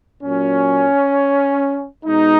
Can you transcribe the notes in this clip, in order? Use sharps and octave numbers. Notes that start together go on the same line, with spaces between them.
A#2 F#3 C#4
B2 G#3 D#4